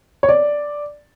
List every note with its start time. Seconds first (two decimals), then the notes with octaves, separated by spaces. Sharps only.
0.23 C#5
0.29 D5